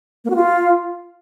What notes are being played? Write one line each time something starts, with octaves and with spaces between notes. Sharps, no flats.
A#3
F#4
F4